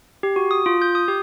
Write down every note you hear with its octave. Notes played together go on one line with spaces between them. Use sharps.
G4
F#4
D#6
F4
G6
D#6
G4